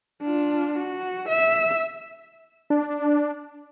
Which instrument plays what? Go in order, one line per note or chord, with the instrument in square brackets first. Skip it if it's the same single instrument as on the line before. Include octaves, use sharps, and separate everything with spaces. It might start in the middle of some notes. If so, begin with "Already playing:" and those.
[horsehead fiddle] D4 F4
F#4
E5
[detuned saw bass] D4